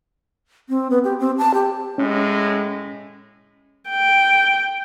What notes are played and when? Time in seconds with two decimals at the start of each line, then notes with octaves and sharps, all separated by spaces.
0.69 C4
0.91 B3
1.04 G4
1.20 C4
1.38 A5
1.54 G4
1.98 A2 G#3 C#4
3.90 G5